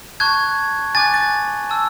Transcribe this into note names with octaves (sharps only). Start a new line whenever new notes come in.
A5 C#6 F#6 G#6
G#5 D6 F#6 A6
A6
A5 E6